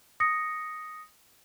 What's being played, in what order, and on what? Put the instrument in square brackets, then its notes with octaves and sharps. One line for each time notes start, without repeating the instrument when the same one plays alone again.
[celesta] D#6 A#6 C#7